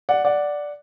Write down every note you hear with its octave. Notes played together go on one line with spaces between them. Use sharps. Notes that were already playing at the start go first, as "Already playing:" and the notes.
D5 F#5
D5 F#5